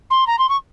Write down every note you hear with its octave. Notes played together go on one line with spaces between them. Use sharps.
C6
A#5
C6
C#6